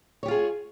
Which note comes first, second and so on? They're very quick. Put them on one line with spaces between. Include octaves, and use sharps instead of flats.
C#5 G4 F4 G#4